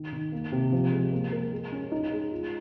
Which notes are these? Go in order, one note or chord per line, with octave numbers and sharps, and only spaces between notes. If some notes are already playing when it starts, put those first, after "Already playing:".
Already playing: D#3
D#3
A#3
C3
F3
G#3
A#3
A#4
G#3
C#4
D#4
G#3
F4